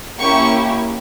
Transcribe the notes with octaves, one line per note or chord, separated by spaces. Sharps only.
A#3 C#4 E4 G4 C#6